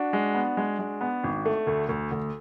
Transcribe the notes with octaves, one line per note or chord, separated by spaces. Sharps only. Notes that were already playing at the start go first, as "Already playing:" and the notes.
Already playing: D4 F#4
G#3
B3
G#3
G#3
B3
G#1
A3
D2
D2
D2